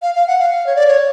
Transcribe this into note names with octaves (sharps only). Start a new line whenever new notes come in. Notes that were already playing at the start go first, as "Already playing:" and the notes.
F5
F5
F#5
F5
C#5
D5
C#5